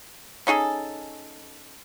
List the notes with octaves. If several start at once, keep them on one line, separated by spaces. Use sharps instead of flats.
C#4 D#4 G#4 A4